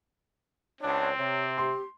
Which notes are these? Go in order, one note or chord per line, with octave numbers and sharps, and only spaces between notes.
C#2 C4 D4 C#5
C3 C#5
G4 C6